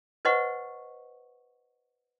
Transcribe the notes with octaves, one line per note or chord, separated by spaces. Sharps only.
B4 C5 D#5 F#5 C#6